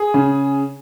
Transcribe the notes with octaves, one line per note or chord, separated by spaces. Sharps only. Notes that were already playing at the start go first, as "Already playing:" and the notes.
Already playing: G#4
C#3